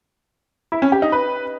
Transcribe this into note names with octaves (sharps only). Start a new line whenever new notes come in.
E4
C#4
G4
D#4
B4